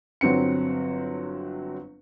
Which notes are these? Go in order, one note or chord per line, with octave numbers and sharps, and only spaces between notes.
G1 F#3 C4 C#7